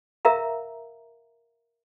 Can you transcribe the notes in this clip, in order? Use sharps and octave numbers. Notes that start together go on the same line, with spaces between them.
A#4 E5 F5 A#5